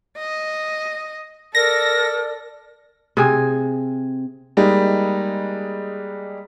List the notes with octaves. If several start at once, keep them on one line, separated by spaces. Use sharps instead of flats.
D#5
A4 A#4 D5 A#6
C3 G#4
G3 G#3 A#3 D#4